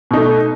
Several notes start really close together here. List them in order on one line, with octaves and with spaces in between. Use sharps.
B2 D#4 A3